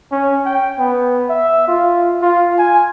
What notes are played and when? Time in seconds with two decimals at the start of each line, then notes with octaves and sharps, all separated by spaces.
0.12 C#4
0.46 G5
0.79 B3
1.29 E5
1.68 F4
2.22 F4
2.58 G#5